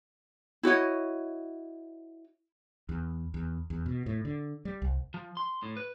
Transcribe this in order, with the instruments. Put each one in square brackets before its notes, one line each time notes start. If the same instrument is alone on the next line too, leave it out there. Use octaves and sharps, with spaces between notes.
[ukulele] E4 F#4 C#5 D#5
[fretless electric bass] E2
E2
E2
B2
A2
D3
G3
C2
[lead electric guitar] F3
C6
A2
B4